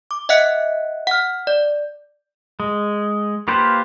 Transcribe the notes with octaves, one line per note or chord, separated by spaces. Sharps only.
D6
D#5 E5 F#5 F#6 C#7
F#5 F6
D5
G#3
A#3 F4 G4 B4 C5